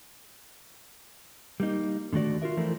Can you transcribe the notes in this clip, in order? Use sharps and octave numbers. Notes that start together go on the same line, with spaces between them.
G3 A#3 D#4
D3 D#3 A3 F#4 D5
F4 F#4 A#4 E5
E3 F3 A3 E4 A#4